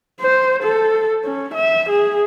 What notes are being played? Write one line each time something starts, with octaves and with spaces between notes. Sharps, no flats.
C5
A4
C#4
E5
G#4